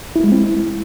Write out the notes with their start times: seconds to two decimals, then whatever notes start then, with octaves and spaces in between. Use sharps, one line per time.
0.16 E4
0.24 G#3
0.32 C4
0.40 E4